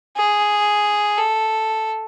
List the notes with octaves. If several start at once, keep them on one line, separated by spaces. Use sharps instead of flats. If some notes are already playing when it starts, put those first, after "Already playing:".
G#4
A4